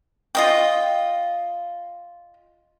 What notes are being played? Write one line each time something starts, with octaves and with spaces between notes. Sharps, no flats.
F4 D#5 G5